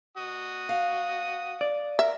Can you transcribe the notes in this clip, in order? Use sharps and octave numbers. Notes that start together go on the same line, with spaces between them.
F#4 D#6
F5
D5
A#4 E5